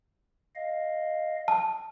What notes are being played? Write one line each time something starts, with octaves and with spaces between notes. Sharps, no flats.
D#5 F5
A5